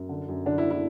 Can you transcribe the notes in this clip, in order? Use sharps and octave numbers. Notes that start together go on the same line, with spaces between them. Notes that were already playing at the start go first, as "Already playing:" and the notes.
Already playing: F#2
D3
F#2
D3 D4
E4
E4